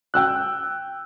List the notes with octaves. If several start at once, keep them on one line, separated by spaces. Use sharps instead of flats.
G5 E6 F#6